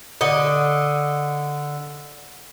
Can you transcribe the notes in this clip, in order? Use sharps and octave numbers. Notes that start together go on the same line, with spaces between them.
D3 D#5